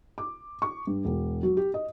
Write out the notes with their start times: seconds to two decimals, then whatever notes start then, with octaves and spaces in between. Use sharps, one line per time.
0.18 D6
0.62 C#6
0.87 G2
1.05 E1
1.43 F#3
1.57 G4
1.74 D#5